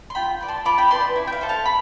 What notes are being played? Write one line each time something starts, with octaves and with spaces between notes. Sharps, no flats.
C6
F4 G5 B5
B4 D5
A5 C6
F4 B5 D6
G5 B5
B4 D5 A5 C6
E4
G5
F5
A4 C5
F5 A5
B5